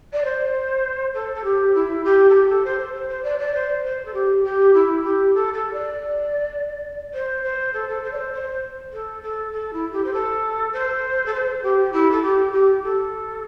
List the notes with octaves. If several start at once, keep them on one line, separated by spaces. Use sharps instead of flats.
D5
C5
A4
A4
G4
E4
G4
A4
G4
A4
C5
C5
C5
C5
D5
D5
C5
C5
A4
G4
G4
E4
G4
A4
A4
D5
C5
C5
A4
A4
C5
D5
C5
C5
A4
A4
A4
E4
G4
C5
A4
C5
A4
C5
G4
E4
A4
G4
G4
A4